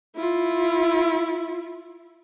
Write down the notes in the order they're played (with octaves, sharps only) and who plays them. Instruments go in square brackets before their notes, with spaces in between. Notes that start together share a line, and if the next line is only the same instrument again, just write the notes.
[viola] E4 F4